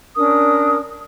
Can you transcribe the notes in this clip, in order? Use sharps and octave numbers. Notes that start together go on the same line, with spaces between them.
C#4 D4 A#4 D#6